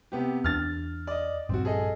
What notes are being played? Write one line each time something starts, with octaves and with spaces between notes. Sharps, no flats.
C3 B3 G4
E2 D4 F6 A6
D5 D#5
A#1 G2 C4 F#4
G#4 A4 D#5